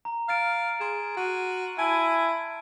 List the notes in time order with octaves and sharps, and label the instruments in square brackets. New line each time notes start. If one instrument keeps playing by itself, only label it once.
[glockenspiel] A#5
[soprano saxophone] F5 [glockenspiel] F6 A6 D7
[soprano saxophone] G#4 [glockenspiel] C6 E7
[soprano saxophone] F#4 [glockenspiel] C7 D#7
[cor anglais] E4 [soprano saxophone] G#5 [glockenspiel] A5 D7